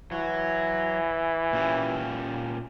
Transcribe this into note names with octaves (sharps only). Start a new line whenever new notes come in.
E3 F#3
A#2 C#4 G4